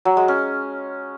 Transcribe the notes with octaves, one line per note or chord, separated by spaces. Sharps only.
F#3
G#3
C#4